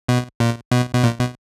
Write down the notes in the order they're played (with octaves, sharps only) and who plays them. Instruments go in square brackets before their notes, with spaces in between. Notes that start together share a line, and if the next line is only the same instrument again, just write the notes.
[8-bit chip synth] B2
A#2
B2
B2
A#2
B2